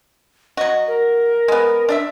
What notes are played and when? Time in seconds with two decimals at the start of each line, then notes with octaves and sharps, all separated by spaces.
0.57 F#3 F#4 D#5
0.88 A#4
1.48 G#3 B3
1.89 D4 D#5 E5